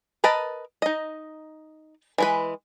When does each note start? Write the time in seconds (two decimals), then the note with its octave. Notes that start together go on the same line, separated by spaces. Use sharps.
0.24 A#4 B4 D#5 A5
0.82 D#4 D#5
2.18 E3 G#3 B4